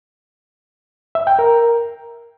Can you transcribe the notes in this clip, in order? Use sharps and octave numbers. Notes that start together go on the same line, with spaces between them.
E5
G5
A#4